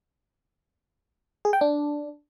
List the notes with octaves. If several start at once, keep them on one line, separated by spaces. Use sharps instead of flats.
G#4
G5
D4